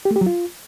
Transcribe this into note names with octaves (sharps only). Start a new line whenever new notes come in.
G4
A3
G4
F#3
F4